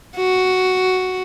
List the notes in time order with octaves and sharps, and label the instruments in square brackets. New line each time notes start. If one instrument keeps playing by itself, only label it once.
[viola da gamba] F#4